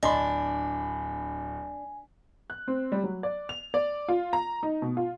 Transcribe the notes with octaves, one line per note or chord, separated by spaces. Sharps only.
D1 D4 D#5 G#5 A5 B5 C6
F#6
C4
G3
F#3
D5
F7
D5
F4
A#5
D#4
B2
F4